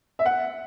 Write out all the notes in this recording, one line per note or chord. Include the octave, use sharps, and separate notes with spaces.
E5
F#5